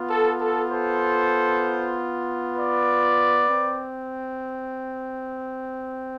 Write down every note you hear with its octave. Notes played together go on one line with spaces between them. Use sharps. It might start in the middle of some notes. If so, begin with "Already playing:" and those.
Already playing: B3 F4
A4
A4
A4 C5
B4 D5
C4